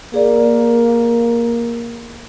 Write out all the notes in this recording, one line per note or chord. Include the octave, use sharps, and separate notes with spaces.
A#3 G#4 A#4 D5